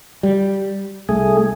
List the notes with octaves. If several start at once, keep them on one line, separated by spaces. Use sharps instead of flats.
G3
C2 A3 G#4